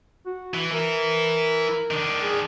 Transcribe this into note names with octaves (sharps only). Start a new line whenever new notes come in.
F#4
E3
E3 E4 A#4
D#3 D4
G#4